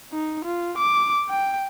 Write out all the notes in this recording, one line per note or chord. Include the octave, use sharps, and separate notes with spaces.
D#4
F4
D6
G5